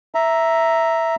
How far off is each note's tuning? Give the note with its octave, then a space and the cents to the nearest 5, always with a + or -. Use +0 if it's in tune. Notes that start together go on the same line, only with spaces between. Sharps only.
E5 +0 A#5 +0